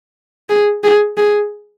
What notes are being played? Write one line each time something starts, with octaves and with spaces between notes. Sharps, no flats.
G#4
G#4
G#4